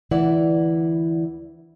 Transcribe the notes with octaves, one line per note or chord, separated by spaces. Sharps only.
D2 E3 E4 B4 D5 F#5